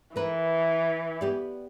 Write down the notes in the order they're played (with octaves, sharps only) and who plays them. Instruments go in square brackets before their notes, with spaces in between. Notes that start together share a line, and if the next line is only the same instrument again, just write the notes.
[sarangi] E3 [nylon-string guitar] A#4 B4
[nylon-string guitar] B3 G4 D5